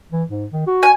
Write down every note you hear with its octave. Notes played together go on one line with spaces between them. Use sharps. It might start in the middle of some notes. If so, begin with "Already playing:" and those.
E3
G#2
D#3
F#4
G#5